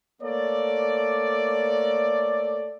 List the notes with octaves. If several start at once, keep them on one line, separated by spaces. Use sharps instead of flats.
A3 A#3 A4 C#5 D5